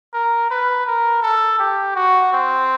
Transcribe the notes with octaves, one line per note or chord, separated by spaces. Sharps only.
A#4
B4
A#4
A4
G4
F#4
C4